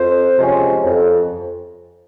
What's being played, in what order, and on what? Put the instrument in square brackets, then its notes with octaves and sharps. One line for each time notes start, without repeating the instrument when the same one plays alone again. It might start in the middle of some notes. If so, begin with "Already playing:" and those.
Already playing: [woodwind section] F2 C5
C3 F3 G#3 C#4
F2